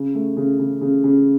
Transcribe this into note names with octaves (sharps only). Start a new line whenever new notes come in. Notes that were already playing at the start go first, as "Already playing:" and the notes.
Already playing: C#3
A3
C#3
C#3
C#3
C#3